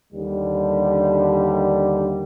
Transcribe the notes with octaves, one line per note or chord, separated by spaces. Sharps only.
D#2 D3 G3